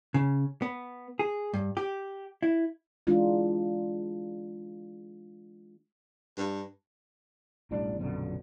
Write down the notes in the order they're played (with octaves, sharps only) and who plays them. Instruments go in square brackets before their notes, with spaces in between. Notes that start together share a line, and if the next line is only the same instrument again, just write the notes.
[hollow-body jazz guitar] C#3
B3
G#4
G2
G4
E4
[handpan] E3 G#3 D4 D#4 F4
[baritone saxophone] G2
[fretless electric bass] E1 A1 G3 D4
A#1 F#2 B2 D3